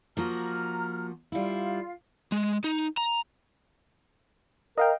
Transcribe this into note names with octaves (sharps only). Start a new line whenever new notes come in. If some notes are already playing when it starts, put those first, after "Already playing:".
F3 A#3 F#4 A#5 F6
G3 E4 F4 F5
G#3
D#4
A#5
A#4 D#5 F5 G5